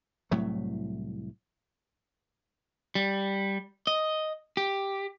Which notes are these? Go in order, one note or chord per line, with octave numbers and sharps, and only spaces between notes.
C2 A2 F#3 A3
G3
D#5
G4